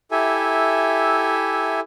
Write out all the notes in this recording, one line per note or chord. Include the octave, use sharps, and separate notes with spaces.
E4 G4 A4 E5 G#5